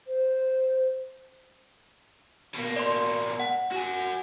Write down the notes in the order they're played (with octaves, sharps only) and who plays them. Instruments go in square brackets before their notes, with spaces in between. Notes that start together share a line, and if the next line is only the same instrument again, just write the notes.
[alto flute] C5
[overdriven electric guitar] B2 A#3
[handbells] D5 C6
F#5
[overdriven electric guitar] F#4 G#5